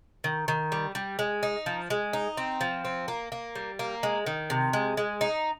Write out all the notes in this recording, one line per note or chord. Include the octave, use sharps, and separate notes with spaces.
D#3
D#3
G3
G3
G#3
D#4
F3
G#3
D#4
C4
F3
C4
A#3
A#3
G3
A#3
G#3
D#3
C3
G#3
G#3
D#4